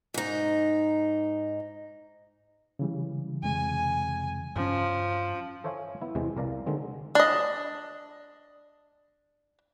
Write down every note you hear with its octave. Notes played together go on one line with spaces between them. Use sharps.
G#2 D#4
C#3 E3 G3
F2 C3 G#3 G#5
G2 F3 C#4
A4 C5 C#5 E5 F5 G#5
B3 E4
E2 C3 E3 G#3 C4
C2 A#4 D5 F5 A#5
D3 D#3 G#3 C4
D4 D#5